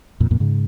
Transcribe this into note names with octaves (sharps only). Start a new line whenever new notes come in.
F2 A#2
F2 A#2
G#2 C#3